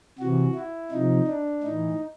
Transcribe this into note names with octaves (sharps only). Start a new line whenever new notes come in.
C3 E3 F#4
E4
C3 F3 D#4
D4
A2 E3 D#4